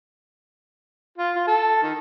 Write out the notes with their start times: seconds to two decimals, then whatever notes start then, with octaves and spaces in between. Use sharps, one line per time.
1.18 F4
1.35 F4
1.47 A4
1.82 D#3